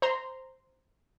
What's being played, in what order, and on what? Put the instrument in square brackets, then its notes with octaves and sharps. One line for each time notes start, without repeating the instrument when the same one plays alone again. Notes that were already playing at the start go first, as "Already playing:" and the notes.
[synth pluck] C5 A#5 C6